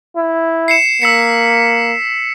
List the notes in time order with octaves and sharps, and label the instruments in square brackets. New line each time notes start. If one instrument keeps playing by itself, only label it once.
[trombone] E4
[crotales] C7 C#7 E7
[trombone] A#3 [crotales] E6 B6 C#7